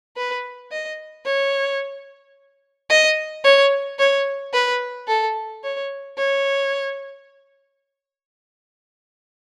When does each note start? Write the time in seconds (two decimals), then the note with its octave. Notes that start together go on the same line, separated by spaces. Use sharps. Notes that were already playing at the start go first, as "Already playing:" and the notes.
0.17 B4
0.71 D#5
1.25 C#5
2.90 D#5
3.44 C#5
3.99 C#5
4.53 B4
5.08 A4
5.64 C#5
6.18 C#5